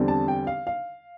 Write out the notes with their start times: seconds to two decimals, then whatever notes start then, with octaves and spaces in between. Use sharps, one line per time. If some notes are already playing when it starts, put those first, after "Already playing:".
Already playing: E2 D3 G3 C4
0.08 A5
0.28 G5
0.47 F5
0.67 F5